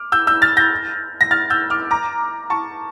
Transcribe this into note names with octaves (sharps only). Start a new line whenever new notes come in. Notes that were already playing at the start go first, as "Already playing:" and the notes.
Already playing: D6 F6
E6 G6
E6 G6
F6 A6
G6 A#6
A#6
F6 A6
E6 G6
D6 F6
A#5 D6
A5 C#6